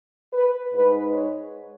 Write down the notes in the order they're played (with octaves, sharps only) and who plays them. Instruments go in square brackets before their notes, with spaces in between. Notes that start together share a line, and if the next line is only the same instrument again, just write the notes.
[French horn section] B4
G#2 G#3 D#4 B4
C#5